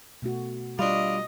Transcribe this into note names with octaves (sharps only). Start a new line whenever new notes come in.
B2 A3 F#4
G3 D4 F4 D#5